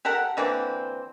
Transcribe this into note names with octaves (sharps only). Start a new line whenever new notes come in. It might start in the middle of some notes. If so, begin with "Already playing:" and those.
G4 A4 A#4 F#5
D3 E3 A#3 C4